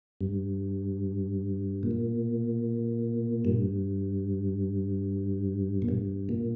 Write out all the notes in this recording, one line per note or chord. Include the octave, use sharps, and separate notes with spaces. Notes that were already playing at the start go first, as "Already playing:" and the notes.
G2
A#2
G2
A#2
G2
A#2